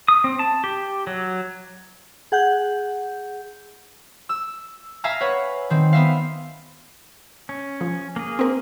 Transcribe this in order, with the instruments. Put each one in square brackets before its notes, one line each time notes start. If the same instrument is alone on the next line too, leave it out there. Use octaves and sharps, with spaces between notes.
[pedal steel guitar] D#6
C4
A5
G4
F#3
[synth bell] G#4 F#5 G6
[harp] E6
E5 F5 G#5 A#5 F6
B4 C#5 F#5
D#3 C4
B3 E5 F5
[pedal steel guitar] C#4
[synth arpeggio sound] F3
[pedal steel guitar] A#3 G#4
[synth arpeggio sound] C4 A#4